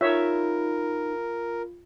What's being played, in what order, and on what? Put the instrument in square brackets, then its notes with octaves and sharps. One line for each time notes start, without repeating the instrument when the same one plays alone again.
[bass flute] D#4 [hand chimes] F4 [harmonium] A#4 [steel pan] C#5 E5